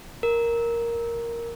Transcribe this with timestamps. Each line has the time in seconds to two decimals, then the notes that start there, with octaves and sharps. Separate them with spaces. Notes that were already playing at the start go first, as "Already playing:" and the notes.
0.23 A#4